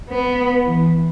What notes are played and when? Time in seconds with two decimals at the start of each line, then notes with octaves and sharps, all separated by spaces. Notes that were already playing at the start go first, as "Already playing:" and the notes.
0.10 B3
0.65 E3